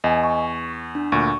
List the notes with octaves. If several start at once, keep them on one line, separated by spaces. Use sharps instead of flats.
E2 D#5 G#5
C#6
D4
D2 A#2 C#6